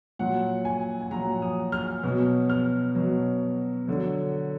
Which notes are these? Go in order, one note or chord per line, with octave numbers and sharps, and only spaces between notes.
A#2 F#3 F#5
G#5
G#5
A#2 F#3 A#5
D#6
F6
B2 F#3 F6
F6
B2 F#3
D3 F#3